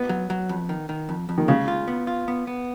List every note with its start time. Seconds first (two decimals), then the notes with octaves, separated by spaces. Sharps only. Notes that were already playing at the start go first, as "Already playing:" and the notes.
Already playing: B3
0.09 F#3
0.30 F#3
0.49 F2
0.69 D#3
0.89 D#3
1.09 F2
1.29 F2
1.38 D#3
1.48 C#3 G#3
1.68 F4
1.88 B3
2.07 F4
2.28 B3
2.47 B3